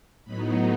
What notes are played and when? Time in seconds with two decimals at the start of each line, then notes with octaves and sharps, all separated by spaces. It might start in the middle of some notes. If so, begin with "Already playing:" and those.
0.24 A2 F#3 B3 D#4 B5